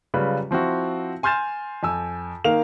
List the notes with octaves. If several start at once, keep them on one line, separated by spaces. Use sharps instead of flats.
C#3 F#3 G3 F4 B4
F3 C4 E4 F#4
G#5 C6 F6 G6 A6 E7
F2 G#5 E6
D#3 A#3 A#4 F5 F7